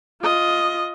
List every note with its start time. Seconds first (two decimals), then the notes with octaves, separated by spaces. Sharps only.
0.22 F4 D#5